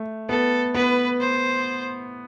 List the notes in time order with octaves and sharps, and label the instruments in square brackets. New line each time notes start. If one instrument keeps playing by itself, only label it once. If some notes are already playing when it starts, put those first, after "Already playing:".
Already playing: [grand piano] A3
[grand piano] B3 [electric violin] A4
[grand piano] B3 [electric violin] B4
[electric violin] C5